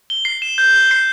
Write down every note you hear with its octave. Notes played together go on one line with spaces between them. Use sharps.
G7
C7
E7
G6
G7
C7